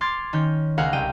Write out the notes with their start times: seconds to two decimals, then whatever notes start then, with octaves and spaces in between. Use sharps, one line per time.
0.01 C6 D6 F6 G#6 A6
0.33 D#3 C#4 G6
0.78 C#2 G#4 A#4 F5 F#5
0.93 C2 G5 D#7